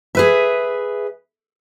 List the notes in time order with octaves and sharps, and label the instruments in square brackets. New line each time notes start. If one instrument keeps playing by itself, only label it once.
[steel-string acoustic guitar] G#4 B4 E5